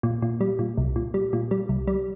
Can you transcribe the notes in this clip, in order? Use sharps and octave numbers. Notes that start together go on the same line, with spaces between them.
A#2
A#2
G3
A#2
C2
A#2
G3
A#2
G3
C2
G3